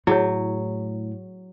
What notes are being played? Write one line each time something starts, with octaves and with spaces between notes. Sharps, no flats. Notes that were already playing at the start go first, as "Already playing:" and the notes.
A2 F#3 E4 G#4 C#5